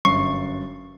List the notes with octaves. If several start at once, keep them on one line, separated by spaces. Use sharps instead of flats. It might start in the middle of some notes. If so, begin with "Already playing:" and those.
G1 F#2 C#6 C7